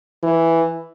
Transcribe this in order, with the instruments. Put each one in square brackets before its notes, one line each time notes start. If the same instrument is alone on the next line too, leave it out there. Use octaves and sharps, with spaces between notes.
[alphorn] E3